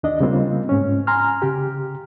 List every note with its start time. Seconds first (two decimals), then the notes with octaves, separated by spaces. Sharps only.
0.03 D#2 D4 D#5
0.20 C#3 G3 A#3 C4 F4
0.69 G#2 C#4
1.07 G#5 A#5 C6 F6
1.42 C#3 G4